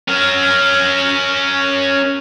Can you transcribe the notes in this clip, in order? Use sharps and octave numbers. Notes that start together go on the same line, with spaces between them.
C#4 A#4